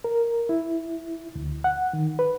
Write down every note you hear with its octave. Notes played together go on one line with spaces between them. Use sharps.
A#4
E4
D2
F#5
D#3
B4